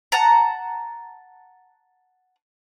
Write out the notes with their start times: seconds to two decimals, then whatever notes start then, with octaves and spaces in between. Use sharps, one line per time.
0.12 F#5 A5 A#5